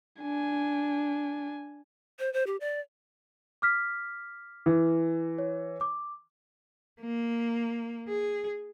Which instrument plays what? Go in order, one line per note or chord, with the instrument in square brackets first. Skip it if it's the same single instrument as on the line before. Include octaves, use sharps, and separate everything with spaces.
[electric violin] D4 G#5
[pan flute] C5
C5
G4
D5
[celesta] D6 F6 B6
[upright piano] E3
[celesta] C#5
D6
[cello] A#3
G#4